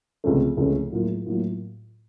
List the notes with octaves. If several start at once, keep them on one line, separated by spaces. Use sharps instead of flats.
C#2 C3 F3 A3 C#4
C#2 C3 F3 A3 C#4
A2 F#3 A#3 F4
A2 F#3 A#3 F4